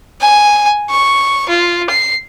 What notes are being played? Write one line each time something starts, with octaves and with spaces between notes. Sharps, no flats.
G#5
C#6
F4
C7